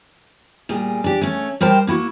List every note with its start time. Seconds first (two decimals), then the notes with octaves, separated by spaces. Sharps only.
0.69 A#2 G3 G#4
1.04 D4 G4
1.21 A3 C#4
1.61 G3 A#4 C5 G5 A5
1.87 A#3 E4 F#4